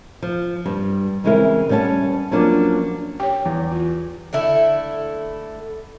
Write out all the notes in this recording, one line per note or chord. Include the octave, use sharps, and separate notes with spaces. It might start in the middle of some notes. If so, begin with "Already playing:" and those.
F3
G2 G3
C#3 E3 G#3 C4 E4 A#4
G3 B3 C#4 D5 A5
F3 F#3 A#3 B3 C#4 D4
G4 C#5 G5
E2
F4
D3 A3 E4